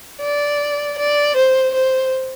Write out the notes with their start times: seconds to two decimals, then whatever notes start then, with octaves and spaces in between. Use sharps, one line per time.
0.21 D5
0.98 D5
1.36 C5
1.74 C5